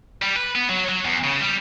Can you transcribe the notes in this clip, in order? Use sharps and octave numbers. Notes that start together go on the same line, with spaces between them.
G3
B4
B3
F#3
F#3
E2
C#3
G3